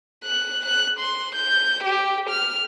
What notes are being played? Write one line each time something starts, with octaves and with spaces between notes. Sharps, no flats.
F#6
F#6
C6
G6
G4
F6